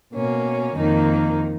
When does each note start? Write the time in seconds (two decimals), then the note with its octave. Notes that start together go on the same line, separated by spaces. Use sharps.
0.14 B2 A#3 C#4
0.75 F2 D#3 A#3 D#4